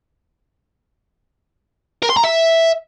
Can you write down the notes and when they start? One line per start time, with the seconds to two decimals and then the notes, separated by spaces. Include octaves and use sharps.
2.03 A#4
2.10 C6
2.17 A#5
2.24 E5